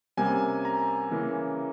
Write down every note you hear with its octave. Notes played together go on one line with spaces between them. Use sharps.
C3 G3 A#3 C#4 G#5
A#5
C#3 E3 A#3 C#4